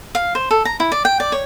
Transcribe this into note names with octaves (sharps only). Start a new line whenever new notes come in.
F5
C5
A4
A#5
E4
D5
G5
D5
C#5